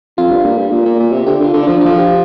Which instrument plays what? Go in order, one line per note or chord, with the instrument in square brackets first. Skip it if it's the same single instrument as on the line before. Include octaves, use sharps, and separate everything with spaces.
[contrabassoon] F2 [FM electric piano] F4
[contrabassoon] G2
A#2
G2
A#2
A#2
A#2
C3
[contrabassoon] D3 [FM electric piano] G4
[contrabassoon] D3 [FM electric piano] F4
[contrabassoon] D3
[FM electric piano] D4
[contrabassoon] F3
[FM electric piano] F4
[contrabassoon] F3
[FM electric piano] G4